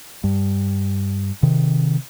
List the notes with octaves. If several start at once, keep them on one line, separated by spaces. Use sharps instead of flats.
G2
C3 D#3